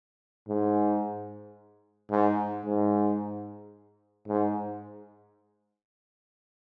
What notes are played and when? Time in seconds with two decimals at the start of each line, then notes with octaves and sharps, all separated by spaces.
0.49 G#2
2.11 G#2
2.65 G#2
4.28 G#2